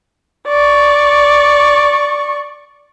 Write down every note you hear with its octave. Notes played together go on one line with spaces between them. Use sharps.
D5 C#6